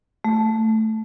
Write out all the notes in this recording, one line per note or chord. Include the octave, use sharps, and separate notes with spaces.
A3